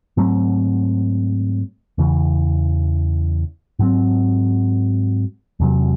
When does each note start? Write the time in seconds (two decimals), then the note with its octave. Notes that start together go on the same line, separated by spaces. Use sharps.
0.17 G#2 F#3 A3 C4
1.98 E2 C#3 E3
3.79 G#2 F#3 C4
5.60 E2 C3 F#3